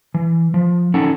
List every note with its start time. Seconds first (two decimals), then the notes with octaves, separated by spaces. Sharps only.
0.14 E3
0.54 F3
0.94 C#4 D#4 A4 F#5